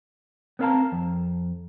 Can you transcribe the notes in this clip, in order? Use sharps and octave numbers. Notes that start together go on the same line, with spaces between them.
B3 C4 A#4 F5 A5 A#5
F2